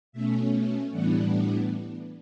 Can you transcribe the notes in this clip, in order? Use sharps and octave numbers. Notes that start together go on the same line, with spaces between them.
B2 A3 C#4 E5
A2 E3 G3 B3 D4 F#5